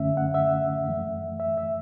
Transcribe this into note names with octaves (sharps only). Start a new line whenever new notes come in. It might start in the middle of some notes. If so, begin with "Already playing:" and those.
Already playing: F#2 D3 A3 C#4 E5
F#5
E5
F#2 E3 A3
E5
E5